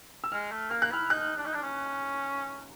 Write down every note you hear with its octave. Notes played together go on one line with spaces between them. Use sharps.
E6
G#3 F6
A3
A#3 F6
F#6
E4 F6
D#4 F#6
D4
D#4
D4
C#4